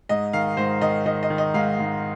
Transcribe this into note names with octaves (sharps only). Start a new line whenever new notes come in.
G#2 D#5
D#3 F5
G#2 C5
D#3 D#5
D#3 D#5
D#5
D#3
D#5
G#2 F5
G#2